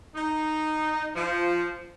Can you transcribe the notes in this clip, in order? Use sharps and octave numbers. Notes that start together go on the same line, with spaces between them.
D#4
F3